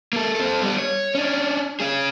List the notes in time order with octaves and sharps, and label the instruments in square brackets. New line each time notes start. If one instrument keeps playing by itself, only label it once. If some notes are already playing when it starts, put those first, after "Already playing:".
[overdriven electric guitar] A#3 A4
C4 A4
G3 B3
C#5
C#4 D4
C#4 G#4